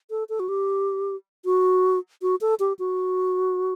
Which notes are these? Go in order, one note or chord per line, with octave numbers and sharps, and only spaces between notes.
A4
A4
F#4
G4
F#4
F#4
A4
G4
F#4